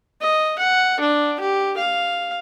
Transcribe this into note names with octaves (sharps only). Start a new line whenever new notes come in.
D#5
F#5
D4
G4
F5